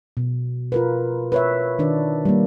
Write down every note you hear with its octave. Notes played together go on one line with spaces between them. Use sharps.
B2
F4 A#4 B4
B4 C#5 E5
D#3 D4 D5
G3 A#3